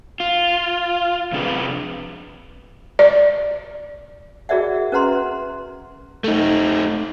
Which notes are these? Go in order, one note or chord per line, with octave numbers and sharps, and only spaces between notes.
F4
C3 F3 C4 D4 G#4 B4
D5
F#4 G#4 A#4 D5 E5 F#5
C#4 A#4 B4 F#5 A#5 C6
A3 D#4